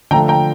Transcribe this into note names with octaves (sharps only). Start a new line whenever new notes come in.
D3 F3 A3 G5 A#5
G5 A#5